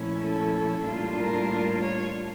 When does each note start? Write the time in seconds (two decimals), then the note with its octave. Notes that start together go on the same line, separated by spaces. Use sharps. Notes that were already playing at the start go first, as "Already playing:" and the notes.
Already playing: A#2 F3 A3 C#4 E4
0.22 A4
0.85 A2 G3 A#3 D4 F4
1.17 A#4
1.81 C#5